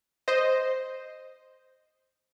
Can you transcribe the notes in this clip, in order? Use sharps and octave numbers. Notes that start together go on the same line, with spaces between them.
C5 D#5